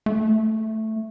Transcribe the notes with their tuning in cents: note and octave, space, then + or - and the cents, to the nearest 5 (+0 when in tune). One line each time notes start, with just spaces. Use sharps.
A3 +0